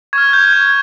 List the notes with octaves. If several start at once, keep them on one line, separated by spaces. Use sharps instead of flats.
C#6 F6 G#6
G6
G#6